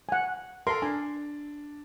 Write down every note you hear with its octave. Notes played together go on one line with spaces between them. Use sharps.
F#5 G#5
A4 A#4 C6
D4 G#5